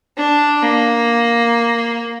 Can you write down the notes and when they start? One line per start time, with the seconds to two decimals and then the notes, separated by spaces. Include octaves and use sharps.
0.17 D4
0.62 A#3